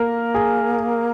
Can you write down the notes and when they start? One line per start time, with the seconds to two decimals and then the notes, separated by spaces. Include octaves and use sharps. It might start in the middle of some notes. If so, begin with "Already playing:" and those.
Already playing: A#3 A#4
0.34 G#4